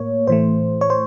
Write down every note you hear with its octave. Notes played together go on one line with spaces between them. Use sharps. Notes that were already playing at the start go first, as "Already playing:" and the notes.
Already playing: A2 A#3 C#5
A2 E3 A3 C5
C#5
C5